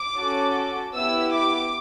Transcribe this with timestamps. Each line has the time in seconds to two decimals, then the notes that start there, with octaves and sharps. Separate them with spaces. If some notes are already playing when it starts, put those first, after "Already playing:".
Already playing: D6
0.18 C#4 F#4 A4
0.95 B3 E4 G4 E6
1.33 D6